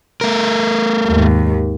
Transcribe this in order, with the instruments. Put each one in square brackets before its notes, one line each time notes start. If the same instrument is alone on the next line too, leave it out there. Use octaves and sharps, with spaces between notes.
[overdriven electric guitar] A3 A#4
[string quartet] D#2 G#2